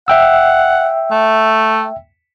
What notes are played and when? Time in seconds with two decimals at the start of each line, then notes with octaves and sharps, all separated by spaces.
0.08 E5 F#5 G5 E6
1.11 A3